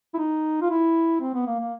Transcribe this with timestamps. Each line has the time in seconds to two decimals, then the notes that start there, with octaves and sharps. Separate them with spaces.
0.14 E4
0.18 D#4
0.61 F4
0.70 E4
1.21 C4
1.34 B3
1.46 A#3
1.60 A#3